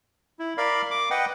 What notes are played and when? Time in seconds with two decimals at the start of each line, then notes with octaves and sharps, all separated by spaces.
0.39 E4
0.57 A#4 D5 F5 B5
0.91 D6
1.11 B4 D#5 F#5 G5